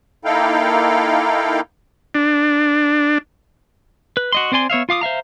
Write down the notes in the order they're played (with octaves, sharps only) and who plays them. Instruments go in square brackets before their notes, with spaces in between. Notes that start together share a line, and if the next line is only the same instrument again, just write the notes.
[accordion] A#3 D#4 E4 A4 F5 G5
[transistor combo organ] D4
[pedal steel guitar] B4
F#4 D#5 C6
C4 C5 D5 G#5 C6
B3 C#5 E5 F5
F4 F5 D6 D#6
C5 E5 F5 A#5